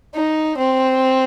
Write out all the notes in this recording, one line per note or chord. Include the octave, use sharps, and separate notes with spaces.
D#4
C4